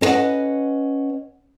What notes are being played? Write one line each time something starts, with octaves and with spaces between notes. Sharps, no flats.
C#4 A#4 B4 D#5 F#5